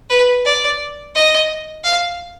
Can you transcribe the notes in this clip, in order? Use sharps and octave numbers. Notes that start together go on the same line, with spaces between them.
B4
D5
D#5
F5